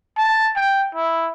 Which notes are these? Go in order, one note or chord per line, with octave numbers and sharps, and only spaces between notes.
A5
G5
E4